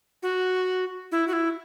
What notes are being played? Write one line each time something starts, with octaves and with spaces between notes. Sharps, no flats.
F#4
E4
F#4
E4